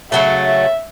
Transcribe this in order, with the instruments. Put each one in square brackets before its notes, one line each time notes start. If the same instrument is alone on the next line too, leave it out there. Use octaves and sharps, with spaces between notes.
[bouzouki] C#3 F#3 A3 [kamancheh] E5
[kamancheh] E5